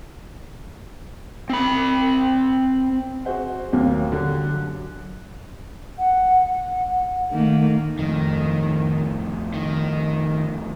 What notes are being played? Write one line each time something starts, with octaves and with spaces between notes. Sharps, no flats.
C4 B5
F#4 G#4 C5 F#5
D#2 A2 F#3 A#3
D3 F#3 G3
F#2
F#5
D#3 A3 A#3
F2 A2 D#3
D#3